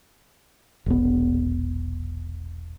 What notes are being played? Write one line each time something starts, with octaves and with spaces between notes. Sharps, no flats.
E1 A#1 B3